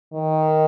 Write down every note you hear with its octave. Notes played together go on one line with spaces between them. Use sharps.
D#3